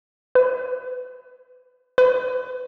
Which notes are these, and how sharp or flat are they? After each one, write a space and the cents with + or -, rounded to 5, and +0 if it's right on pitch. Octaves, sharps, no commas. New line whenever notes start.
B4 +30
B4 +35